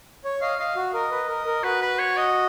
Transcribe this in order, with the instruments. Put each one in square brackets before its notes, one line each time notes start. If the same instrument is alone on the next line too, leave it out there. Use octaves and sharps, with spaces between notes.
[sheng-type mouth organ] C#5
[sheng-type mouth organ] D#5 [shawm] F5
[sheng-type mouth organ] D#5 [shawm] F5
[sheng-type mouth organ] F#4
[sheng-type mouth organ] A#4 [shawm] D#5
[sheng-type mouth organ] B4
A#4
A#4
[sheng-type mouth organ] F#4 [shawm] B4
[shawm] B4
C#5
D#5